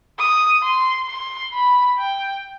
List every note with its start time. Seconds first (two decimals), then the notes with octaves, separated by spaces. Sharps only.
0.18 D#6
0.63 C6
1.08 C6
1.53 B5
1.99 G5